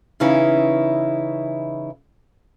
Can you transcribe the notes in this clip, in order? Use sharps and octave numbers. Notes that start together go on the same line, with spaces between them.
C#3 E3 C#4 D#4 E4